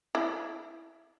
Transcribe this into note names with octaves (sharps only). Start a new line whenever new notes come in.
E4